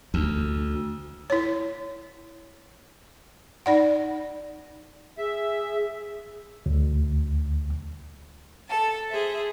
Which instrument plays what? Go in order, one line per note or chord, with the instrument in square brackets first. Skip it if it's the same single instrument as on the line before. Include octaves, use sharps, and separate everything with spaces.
[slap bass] D2
[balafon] E4 C#5
D#4 D5 F#5
[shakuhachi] G#4 [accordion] E5
[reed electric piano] D2
[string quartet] A4 A5
G#4 C5 E5